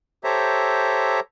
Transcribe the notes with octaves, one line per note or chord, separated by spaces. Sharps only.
G4 A4 C5 C#5 E5 A#5